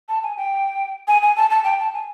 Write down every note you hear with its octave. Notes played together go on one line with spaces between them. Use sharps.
A5
G#5
G5
G#5
G#5
A5
A5
G5
A5
G#5